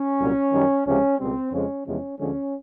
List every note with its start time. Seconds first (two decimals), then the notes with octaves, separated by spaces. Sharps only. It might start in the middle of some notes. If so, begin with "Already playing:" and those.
Already playing: C#4
0.19 C2 A#2 F#3
0.52 F#2 D#3 G3
0.85 C#2 C3 F3 G#3 C#4
1.19 C#2 B2 G3 C4
1.51 F2 C#3 F3 G#3 C#4
1.85 E2 C3 F3 G#3 C#4
2.19 D2 D3 F3 G#3 C#4